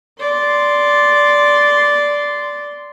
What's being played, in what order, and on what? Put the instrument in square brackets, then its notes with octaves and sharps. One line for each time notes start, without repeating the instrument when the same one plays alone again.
[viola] D5 C6